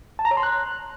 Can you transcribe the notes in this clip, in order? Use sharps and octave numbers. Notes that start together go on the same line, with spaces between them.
A5
A#5
C#5
C6
F#6